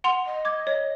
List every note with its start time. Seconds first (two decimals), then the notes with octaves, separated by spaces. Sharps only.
0.04 F#5 C6 F7
0.26 D#5
0.45 D6 G#6
0.67 C#5